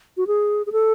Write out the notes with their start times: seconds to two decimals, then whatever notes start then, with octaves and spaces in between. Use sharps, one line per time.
0.17 F#4
0.27 G#4
0.66 G#4
0.72 A4